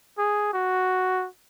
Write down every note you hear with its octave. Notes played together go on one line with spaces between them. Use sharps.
G#4
F#4